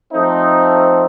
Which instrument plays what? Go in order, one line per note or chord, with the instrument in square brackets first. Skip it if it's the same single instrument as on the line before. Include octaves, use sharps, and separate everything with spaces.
[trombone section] F3 A3 C4 D#4